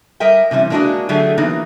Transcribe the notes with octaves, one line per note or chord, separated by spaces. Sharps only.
G3 A#4 D#5 E5 G5
C3 E3 G3 C#4
G#3 A#3 D4 E4 F#4 D#5
D3 F#3 A3 G4 G#4
E3 F#3 A#3 B3 D#4